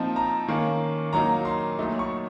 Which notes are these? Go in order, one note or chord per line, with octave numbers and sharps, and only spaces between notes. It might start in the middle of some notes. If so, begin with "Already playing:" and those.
Already playing: A#2 F3 C4 D#4 A5
A#5
D#3 A#3 C#4
A#2 F#3 A#3 D#4 A#5
C6
A#2 F#3 A3 D#4
C#6